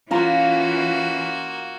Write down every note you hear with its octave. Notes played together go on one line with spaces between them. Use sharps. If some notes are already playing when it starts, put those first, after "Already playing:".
E3 A#3 C#4 F4 F#4 A#5